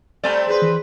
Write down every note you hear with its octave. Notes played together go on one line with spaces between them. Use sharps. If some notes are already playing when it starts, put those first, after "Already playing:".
G3 A3 C4 D5 G#5 A#5
C4 G#4 B4
E3